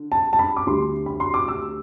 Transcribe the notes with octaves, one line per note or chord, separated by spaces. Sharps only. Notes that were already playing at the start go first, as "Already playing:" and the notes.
Already playing: D3
A5
A5
B5
D6
D2 D3 G3 C6
B5
C6
D6
E6